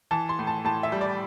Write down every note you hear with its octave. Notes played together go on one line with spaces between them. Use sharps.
E3 A5
C6
A2
A5
A2 A5
E5
G3
D5